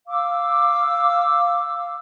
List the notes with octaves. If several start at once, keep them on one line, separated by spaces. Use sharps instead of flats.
F5 D6 E6